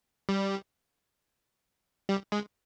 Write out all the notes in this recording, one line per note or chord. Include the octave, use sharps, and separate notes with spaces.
G3
G3
G#3